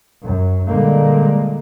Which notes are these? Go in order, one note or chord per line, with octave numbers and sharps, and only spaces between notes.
F#2
A#2 D3 G3 G#3 A#3